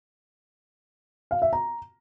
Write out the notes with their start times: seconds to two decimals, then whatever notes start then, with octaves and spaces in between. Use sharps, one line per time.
1.31 F5
1.42 E5
1.53 A#5